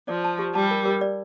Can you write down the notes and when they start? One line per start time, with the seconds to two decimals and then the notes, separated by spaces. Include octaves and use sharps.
0.08 F3 D5
0.24 A5
0.39 G4
0.55 G3 A5
0.71 A#4
0.86 A#4
1.01 D5